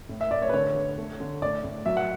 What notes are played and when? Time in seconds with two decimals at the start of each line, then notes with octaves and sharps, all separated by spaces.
0.09 A2
0.21 E5
0.31 A2 D5
0.42 C#5
0.49 B4
0.53 D3 C#5
0.75 D3
0.98 A3
1.20 D3
1.42 A2 D5
1.64 A2
1.86 F#3 E5
1.97 F#5